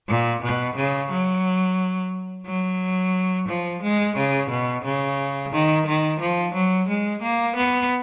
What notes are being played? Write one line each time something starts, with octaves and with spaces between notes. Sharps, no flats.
A#2
B2
C#3
F#3
F#3
F3
G#3
C#3
B2
C#3
D#3
D#3
F3
F#3
G#3
A#3
B3